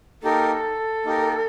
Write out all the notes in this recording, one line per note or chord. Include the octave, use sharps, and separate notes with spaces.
A#3 D#4 G4 A4 A#4
A#3 D#4 G4 A#4